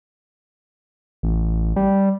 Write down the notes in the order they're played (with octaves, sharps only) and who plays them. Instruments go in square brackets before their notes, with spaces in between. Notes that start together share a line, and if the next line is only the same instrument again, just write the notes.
[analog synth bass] A1
G3